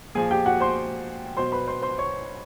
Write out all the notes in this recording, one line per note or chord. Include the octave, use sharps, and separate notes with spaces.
A#2 F3 G#4 G#5
G4 G5
F#4 F#5
C5 C6
B2 F#3 C5 C6
B4 B5
C5 C6
C5 C6
C#5 C#6